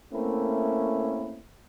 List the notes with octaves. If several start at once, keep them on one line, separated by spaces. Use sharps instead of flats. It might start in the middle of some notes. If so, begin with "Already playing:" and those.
A3 A#3 C4 C#4 E4 A#4